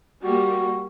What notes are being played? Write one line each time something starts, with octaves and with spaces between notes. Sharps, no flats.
G3 A#3 F#4